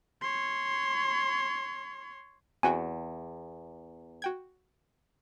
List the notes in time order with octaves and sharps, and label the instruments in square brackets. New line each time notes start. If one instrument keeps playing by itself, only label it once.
[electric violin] C#5 C6
[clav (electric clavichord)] E2 [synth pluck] C4 F#4 G5 [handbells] G#5
[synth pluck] F#4 G5 G#6